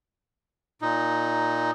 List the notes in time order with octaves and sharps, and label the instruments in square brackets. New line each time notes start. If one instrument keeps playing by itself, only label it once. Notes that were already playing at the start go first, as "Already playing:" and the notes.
[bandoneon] A#2 D#4